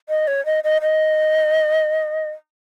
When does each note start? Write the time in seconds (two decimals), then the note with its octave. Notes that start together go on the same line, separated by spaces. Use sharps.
0.09 D#5
0.28 C#5
0.46 D#5
0.64 D#5
0.82 D#5